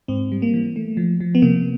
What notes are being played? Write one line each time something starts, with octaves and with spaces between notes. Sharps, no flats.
G#2 C4
G3
A#3
E3
A3
F3
F3
B3
C3 A#3